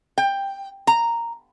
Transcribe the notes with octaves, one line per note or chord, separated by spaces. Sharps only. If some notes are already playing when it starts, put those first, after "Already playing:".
G5
A#5